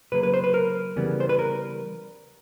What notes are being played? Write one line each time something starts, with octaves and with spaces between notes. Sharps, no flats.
C#3 F#3 A#3 B4
B4
C5
B4
A#4
C#3 E3 G3 B3
C5
B4
A#4